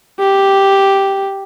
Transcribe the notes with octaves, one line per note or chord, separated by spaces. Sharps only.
G4